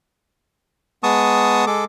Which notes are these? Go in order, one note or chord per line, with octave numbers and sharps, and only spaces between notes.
G#3 B3 A5 C#6 D#6
G#3 A4 D6